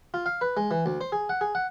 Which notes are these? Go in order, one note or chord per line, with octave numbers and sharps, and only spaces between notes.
F4
F5
B4
G#3
E3
D2
C5
G#4
F#5
G#4
F#5